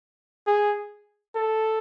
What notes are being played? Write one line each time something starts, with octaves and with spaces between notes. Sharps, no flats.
G#4
A4